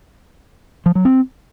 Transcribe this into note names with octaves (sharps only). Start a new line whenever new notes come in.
F3
F#3
C4